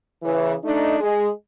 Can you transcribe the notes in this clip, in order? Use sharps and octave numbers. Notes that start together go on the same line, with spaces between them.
C#3 E3
A3 D4 D#4
G#3